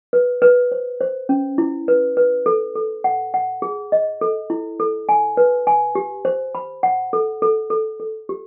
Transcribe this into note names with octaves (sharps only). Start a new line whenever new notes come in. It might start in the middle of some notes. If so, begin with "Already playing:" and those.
B4
B4
C5
C5
C#4
E4
B4
B4
A4
A4
F#5
F#5
G#4
D#5
A4
E4
A4
G#5
B4
G#5
G4
C5
B5
F#5
A4
A4
A4
A4
G4